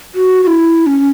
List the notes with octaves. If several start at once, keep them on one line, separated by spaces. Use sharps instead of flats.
F#4
F#4
E4
C#4